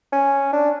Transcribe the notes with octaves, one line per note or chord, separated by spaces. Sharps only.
C#4
D4